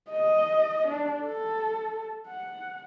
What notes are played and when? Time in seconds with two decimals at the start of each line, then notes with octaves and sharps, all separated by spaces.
0.10 D#5
0.88 D4
1.23 A4
2.28 F#5